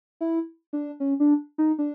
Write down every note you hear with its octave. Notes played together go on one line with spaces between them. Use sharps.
E4
D4
C#4
D4
D#4
D4